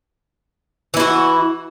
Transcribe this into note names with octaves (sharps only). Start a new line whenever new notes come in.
E3 E4 F#4